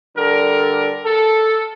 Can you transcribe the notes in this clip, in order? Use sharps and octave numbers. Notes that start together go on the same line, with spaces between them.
D3 G3 A4 A#4
A4